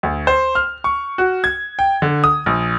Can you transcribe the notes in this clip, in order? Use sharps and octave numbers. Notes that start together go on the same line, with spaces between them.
D2
C5
F6
C#6
F#4
G#6
G5
D3
D#6
A#1